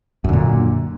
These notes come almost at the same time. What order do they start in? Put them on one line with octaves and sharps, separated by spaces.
F#2 D3 A#2